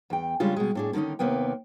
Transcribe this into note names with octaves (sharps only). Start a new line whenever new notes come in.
E2 G5
C#3 G3 G#3 D4 F4
B2 G#3
A2 D4 G#4
D3 D#3 C4 C#4 D#4
D#2 C3 A#3 B3 G5